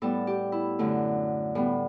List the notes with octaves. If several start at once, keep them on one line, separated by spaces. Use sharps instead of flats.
A2 G3 B3 A4
G4
E4
F#2 D3 A3
A2 G3 B3